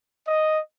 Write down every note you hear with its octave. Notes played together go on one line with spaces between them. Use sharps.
D#5